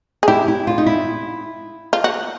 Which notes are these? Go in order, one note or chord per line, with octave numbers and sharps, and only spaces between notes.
G#4
E4 G4
E4
F4
D#4
E4
F4
F#4